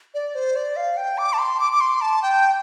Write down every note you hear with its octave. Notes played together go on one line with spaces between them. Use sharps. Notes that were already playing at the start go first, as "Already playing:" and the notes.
D5
C5
D5
F5
G5
D6
A5
C6
D6
D6
C6
A5
G5